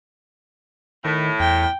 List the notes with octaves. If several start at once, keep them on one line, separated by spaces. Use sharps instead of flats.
A2 D#3
E2 G5